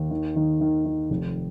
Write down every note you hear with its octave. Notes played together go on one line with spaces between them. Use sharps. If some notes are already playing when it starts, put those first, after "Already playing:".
Already playing: D#2
D#3
D#3
D#3
D#3
F1